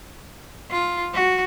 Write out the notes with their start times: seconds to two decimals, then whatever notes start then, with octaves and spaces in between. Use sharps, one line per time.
0.71 F4
1.14 F#4